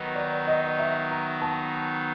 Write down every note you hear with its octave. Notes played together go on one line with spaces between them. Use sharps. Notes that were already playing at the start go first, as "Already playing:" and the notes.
Already playing: D#3 F#3 B3 D#4
D5
D#5
E5
A#5
A5